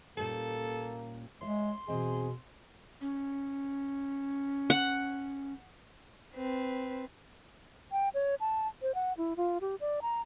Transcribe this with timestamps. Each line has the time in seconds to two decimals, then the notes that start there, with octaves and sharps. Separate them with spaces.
0.17 A#2 G3 A#3 C#4 A4
1.41 G#3 C#5 E5 C6
1.88 E2 B2 C4 G#4 D#5
3.01 C#4
4.70 F#5
6.35 C4 B4
7.92 G5
8.14 C#5
8.40 A5
8.82 C5
8.95 F#5
9.18 E4
9.37 F4
9.61 G4
9.80 D5
10.02 A#5